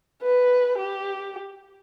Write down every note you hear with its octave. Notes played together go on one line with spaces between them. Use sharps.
B4
G4